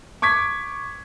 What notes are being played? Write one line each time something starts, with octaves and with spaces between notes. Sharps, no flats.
C#6 D6 G#6 B6